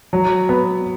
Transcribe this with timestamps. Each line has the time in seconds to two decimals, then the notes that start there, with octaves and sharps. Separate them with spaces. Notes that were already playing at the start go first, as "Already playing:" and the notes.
0.13 F#3
0.49 B3